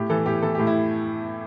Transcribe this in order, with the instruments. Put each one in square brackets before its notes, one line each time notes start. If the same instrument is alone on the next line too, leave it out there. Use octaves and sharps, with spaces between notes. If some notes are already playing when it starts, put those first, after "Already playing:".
Already playing: [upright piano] A2 G4
E3 A4
A2 G4
E3 A4
A2 G4
E4